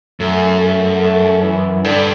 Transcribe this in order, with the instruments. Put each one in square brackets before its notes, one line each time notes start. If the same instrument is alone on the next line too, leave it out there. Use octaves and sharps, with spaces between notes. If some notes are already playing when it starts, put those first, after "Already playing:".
[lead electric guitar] F#2 [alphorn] A3
[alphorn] A3
A3
E3
[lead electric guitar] G2 [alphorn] D3